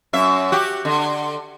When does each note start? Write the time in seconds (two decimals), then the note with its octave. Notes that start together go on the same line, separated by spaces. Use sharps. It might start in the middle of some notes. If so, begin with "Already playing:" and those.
0.13 F#2 E5
0.52 F#4 G4
0.85 D3